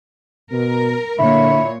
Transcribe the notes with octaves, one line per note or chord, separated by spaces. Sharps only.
B2 A#4
A#2 D3 E4 C#5